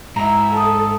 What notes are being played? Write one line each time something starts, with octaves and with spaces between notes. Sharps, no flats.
G#2 E4 E5 A#5
A4 A5 D#6